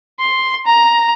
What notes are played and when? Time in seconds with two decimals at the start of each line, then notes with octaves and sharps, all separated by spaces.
0.20 C6
0.66 A#5